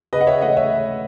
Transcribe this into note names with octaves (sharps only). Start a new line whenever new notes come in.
C#3 B4 D#5
F#5
C#5 E5
A3 D#5 F#5
C#5 E5